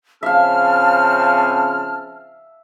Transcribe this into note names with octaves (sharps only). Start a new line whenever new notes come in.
C#3 F3 C4 E5 F5 A5 F6